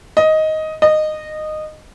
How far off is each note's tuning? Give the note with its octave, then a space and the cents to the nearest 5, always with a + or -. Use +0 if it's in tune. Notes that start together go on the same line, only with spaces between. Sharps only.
D#5 +10
D#5 -15